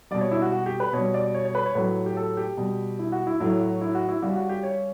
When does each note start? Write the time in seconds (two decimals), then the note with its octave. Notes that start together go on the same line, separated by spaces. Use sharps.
0.11 B2 G3 D5
0.21 C#5
0.31 E4
0.42 F#4
0.52 F#4
0.66 G4
0.80 B4
0.93 B2 G3 C#5
1.14 D5
1.34 C#5
1.45 C#5
1.55 B4
1.66 C#5
1.75 A2 F#3 B4
2.06 G4
2.17 A4
2.37 G4
2.57 B2 G3
2.99 E4
3.12 F#4
3.27 E4
3.40 A2 F#3 E4
3.61 F#4
3.81 E4
3.95 F#4
4.08 E4
4.22 C#3 G3 F#4
4.36 F#4
4.49 G4
4.63 C#5